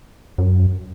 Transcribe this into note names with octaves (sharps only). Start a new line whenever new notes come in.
F#2